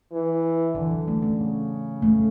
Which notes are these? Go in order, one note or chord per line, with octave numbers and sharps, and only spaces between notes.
E3
D3 E3
F#3
A3
A3 C#4
C#3
A3